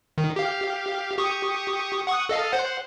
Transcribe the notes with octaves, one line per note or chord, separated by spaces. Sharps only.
D#3
G4 F5
G4 C#6 D#6
F#5 C#6 D#6
A4 D#5 F5
C5 F#5